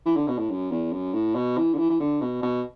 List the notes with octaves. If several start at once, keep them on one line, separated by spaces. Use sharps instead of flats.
E3
D3
B2
A2
F#2
E2
F#2
A2
B2
E3
D3
E3
E3
D3
B2
B2